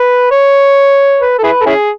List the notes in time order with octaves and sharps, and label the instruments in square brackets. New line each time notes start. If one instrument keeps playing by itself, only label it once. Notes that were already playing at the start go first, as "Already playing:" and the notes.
Already playing: [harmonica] B4
C#5
B4
A4
E4 G#4 B4
A4
C#4 E4 G#4